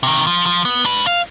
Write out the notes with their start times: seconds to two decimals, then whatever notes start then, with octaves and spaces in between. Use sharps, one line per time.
0.03 C3 D#3
0.27 F3
0.46 F3
0.65 B3
0.85 D4 B4
1.07 F5